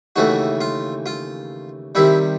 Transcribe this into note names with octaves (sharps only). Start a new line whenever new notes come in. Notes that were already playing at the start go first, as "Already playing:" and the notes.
D#2 C#3 E3 A3 F#4
F4
F4
C3 D#3 G3 E4